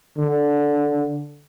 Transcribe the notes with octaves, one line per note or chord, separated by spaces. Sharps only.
D3